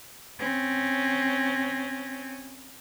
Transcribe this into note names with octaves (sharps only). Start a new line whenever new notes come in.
C4 C#4